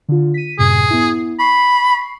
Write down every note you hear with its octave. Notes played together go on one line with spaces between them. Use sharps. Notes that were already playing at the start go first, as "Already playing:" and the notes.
D3 F4
B6 D#7
F#2 A2 C3 G#4
B3 E4
B5 C#6 C7